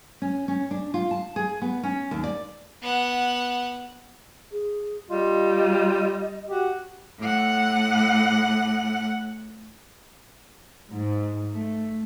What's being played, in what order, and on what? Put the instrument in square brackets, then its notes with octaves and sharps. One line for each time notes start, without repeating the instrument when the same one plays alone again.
[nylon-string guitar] C#4
C#4
D4
F4
A5
G#4
B3
C#4
D#2
D5
[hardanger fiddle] B3 F#5
[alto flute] G#4
[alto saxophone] G3 [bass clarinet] F4 [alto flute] D#5
[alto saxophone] F#4 [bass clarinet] G4
[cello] A2 F#5
[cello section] G#2
A3